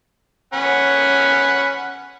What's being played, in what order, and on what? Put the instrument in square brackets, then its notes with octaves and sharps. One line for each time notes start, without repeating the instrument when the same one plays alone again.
[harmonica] C#4 F#5 B5